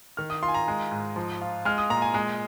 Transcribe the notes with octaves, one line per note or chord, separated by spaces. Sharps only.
D#3 F6
D#6
F4 C6
G#5
A#5
G#3
G#2
F3
F4
G#3 F6
D#6
A#2 A#5
G#5
G#3